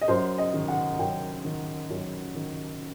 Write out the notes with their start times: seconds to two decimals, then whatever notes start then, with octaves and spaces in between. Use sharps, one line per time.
0.01 D#5
0.08 F#2 C5
0.38 D#5
0.54 D#3
0.68 F#5
0.99 F#2 G5
1.45 D#3
1.90 F#2
2.35 D#3